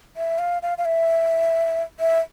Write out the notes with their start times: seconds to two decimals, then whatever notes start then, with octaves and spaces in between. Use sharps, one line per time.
0.17 E5
0.39 F5
0.62 F5
0.78 F5
0.85 E5
2.00 E5